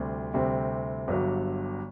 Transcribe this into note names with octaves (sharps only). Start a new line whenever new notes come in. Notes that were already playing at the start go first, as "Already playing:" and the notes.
Already playing: D2 C3 G3 C4
D2 C3 G3 C4
G1 G2 F#3